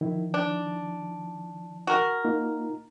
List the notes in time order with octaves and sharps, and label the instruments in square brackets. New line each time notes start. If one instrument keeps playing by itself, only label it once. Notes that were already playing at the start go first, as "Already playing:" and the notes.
[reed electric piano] D#3 F3 E4
[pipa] D4
F#4 A#4
[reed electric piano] A#3 D#4 F4